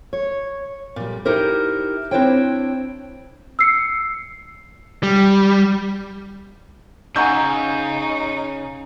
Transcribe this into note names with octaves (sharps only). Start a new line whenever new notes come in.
C#5
A#2 G3
D#4 E4 G4 A#4 C5
C4 D4 E4 C5 C#5 G5
E6 C7 C#7
G3
C#3 D#4 F#5 G#5 A#5 C#6 E6 G6